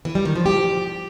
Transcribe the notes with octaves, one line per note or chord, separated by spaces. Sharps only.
E3
G3
D#3
F3
G4